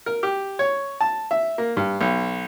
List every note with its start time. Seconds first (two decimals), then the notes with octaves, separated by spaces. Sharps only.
0.06 A#4
0.23 G4
0.59 C#5
1.01 A5
1.31 E5
1.58 A#3
1.77 G2
2.01 B1